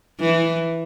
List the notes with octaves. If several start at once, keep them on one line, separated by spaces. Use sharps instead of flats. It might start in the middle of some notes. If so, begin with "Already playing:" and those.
E3